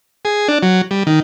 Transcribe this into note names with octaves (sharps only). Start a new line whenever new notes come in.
G#4
D4
F#3
G3
D#3